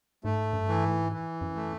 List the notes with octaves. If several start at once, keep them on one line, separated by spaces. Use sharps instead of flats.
G#2 A3
G2
E3
G#2
E3
F#2
A3